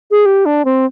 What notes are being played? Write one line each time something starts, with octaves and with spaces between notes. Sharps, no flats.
G#4
G4
D4
C4